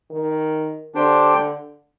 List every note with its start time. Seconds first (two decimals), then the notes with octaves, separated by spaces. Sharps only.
0.11 D#3
0.94 D3 D4 G4 C5 G5